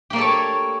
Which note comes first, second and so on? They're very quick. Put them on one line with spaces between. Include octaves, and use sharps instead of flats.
G4 A#3 D5 A4 C#5